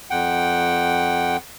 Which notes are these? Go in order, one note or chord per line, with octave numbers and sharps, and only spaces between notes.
F2 F#5 G5